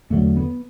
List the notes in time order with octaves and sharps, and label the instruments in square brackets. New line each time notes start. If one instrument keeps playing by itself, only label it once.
[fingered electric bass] E2 D3 F#3 [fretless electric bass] A3
[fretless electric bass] B3